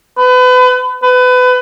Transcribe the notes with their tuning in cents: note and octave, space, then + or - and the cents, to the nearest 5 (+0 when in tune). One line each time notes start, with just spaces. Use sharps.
B4 +30
B4 +25